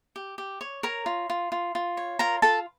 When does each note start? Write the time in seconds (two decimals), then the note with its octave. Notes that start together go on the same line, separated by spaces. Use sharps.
0.16 G4
0.38 G4
0.61 C#5
0.83 A#4 C#5 A#5
1.06 F4
1.30 F4
1.52 F4
1.75 F4
1.97 C#5
2.19 F4 A#4 A#5
2.42 F4 A4 A5